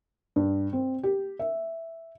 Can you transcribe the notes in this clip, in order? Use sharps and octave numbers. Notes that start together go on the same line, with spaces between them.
G2
C4
G4
E5